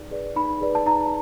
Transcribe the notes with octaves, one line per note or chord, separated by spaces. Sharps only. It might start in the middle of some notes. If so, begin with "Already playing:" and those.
Already playing: D#4 G#4 B4 D5
G#4 B4 D5
D#4 B5
G#4 B4 D5
A5
D#4 A#5